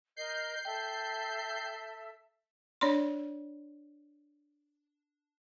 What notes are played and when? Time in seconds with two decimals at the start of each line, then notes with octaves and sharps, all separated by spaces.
0.16 A#4 D#5 G6 C7
0.65 A4 E5 G5
2.81 D4 C#5 D5 C6